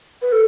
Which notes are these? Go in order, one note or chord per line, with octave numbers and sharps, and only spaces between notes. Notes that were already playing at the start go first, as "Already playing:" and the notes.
B4
A4